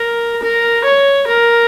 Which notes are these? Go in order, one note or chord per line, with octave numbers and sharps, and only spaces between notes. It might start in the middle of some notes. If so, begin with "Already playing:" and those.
Already playing: A#4
A#4
C#5
A#4